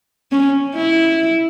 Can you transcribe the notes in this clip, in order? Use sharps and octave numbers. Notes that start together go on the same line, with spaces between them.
C#4
E4